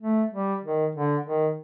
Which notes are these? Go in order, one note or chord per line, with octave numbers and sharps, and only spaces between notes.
A3
G3
D#3
D3
D#3